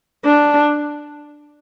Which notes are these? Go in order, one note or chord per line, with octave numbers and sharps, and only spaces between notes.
D4